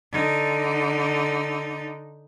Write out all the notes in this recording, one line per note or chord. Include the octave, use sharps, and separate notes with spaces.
D3 D#4